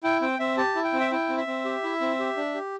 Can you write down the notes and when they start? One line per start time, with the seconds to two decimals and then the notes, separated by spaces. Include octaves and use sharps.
0.04 E4 G5
0.21 C4 G5
0.39 C4 E5
0.58 G4 A5
0.75 E4
0.84 G5
0.93 C4
1.00 E5
1.11 E4 G5
1.29 C4
1.38 E5
1.47 C4
1.65 G4
1.83 E4
2.01 C4
2.19 G4
2.37 D4
2.55 G4